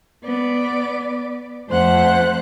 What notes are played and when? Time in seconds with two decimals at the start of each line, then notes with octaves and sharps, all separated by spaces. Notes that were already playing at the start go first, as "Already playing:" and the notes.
0.22 B3 D5
1.69 F2 A3 C5 F#5 F#6